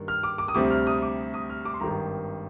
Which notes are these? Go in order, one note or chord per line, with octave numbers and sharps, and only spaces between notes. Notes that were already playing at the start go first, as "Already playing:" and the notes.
Already playing: G2 D#3 A#3
F6
D6
D6
D#6
D2 C3 G3 C4 D6
F6
D#6
D6
D#6
F6
D6
C6
G#1 G2 D#3 A#5